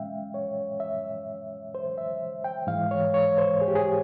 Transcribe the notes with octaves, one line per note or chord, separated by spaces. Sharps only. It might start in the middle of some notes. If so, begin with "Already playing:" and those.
Already playing: A#2 G#3 C#4 E5 F5 G5
C#5
E5
C5
E5
G5
G#2 E3 G#3 F5
C#5
C#5
C5
G#4
G4
G#4